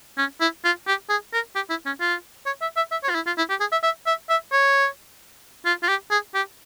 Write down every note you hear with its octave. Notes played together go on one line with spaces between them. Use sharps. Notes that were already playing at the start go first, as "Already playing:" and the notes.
C#4
E4
F4
G4
G#4
A#4
G4
E4
C#4
F4
C#5
E5
E5
E5
C#5
F4
E4
F4
E4
G4
G#4
E5
E5
E5
E5
C#5
F4
F4
G4
G#4
G4